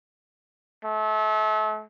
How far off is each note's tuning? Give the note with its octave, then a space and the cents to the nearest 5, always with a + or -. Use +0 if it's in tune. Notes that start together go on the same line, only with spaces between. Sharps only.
A3 -35